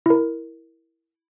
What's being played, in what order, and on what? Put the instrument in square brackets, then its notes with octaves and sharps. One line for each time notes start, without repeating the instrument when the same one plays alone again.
[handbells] E4 A#4